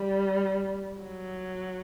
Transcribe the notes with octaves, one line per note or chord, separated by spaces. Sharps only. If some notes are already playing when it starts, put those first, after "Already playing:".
Already playing: G3
F#3